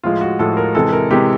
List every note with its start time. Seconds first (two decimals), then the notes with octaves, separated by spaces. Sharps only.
0.03 A2 F3 G#3 F4
0.21 F#4
0.39 A2 F3 G#3 A4
0.57 A#4
0.75 C3 E3 G#3 A4
0.93 A#4
1.10 C3 E3 G#3 G4